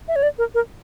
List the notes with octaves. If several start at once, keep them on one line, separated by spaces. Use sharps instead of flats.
E5
C#5
D5
A#4
A#4